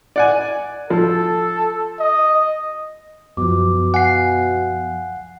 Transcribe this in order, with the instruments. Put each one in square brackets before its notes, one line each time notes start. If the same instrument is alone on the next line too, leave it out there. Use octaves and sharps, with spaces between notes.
[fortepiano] D5 F#5 G#5
[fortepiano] F3 [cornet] A4
[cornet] D#5
[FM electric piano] F#2 F3 [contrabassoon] B2 [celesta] D6
[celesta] F5 G#5 [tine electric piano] F#5 C7